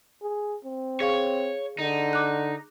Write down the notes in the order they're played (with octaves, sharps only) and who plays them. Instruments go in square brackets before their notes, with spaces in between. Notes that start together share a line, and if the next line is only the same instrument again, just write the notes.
[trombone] G#4
C4
[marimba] G#4 F5 C#6 [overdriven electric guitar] C#5
[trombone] D3 [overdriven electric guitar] D#4
[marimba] D6 F#6